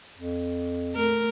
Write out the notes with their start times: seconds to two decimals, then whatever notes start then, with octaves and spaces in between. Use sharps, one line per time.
0.19 F2
0.95 A3 A#4